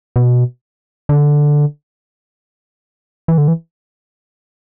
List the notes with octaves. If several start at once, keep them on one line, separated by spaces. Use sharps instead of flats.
B2
D3
E3
D3
E3